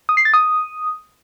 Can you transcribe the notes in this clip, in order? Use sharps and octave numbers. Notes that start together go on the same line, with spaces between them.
D#6
C7
A6
D#6